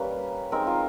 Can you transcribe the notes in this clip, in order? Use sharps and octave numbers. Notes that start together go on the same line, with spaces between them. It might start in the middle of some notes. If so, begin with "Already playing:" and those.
Already playing: G3 A#3 C#4 B4
G#3 C4 D#4 A#4
F4